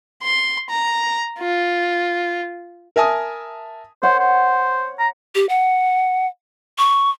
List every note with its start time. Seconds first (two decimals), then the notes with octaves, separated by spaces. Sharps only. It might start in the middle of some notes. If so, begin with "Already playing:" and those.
0.23 C6
0.70 A#5
1.39 F4
2.96 A#4 E5 G#5 A5 D#6
4.03 C5 C#5 F#5
4.20 C5
4.99 A#5
5.35 G4
5.49 F#5
6.78 C#6